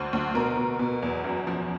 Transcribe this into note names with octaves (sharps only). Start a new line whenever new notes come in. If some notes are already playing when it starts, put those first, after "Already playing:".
Already playing: D2 C5
D2
B2 A#4
B2
B2
E2
F#2
F3